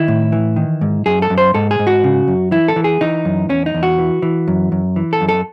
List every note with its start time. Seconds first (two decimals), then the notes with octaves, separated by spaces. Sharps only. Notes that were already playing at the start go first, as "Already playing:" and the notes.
Already playing: D#3 E4
0.08 A2
0.32 E3
0.56 D#3
0.81 G#2
1.06 F#2 G#4
1.22 A4
1.30 F#2
1.38 C5
1.54 G#2 A4
1.71 G#4
1.79 G#2
1.87 F#4
2.04 C#3
2.28 F#2
2.51 E3 E4
2.68 A4
2.76 E3
2.84 G#4
3.01 E3 D#4
3.25 F#2
3.49 E2 C#4
3.66 D#4
3.74 E2
3.83 F#4
3.98 E3
4.22 E3
4.48 F#2
4.72 F#2
4.96 E3
5.13 A4
5.21 F#2
5.28 A4